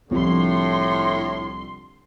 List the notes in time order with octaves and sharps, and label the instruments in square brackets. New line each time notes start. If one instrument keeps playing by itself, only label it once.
[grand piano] C2 F3 [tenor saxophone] A2 [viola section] D3 C6